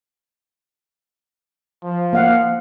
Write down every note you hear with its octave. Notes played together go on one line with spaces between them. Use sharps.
F3
A#3 F5 F#5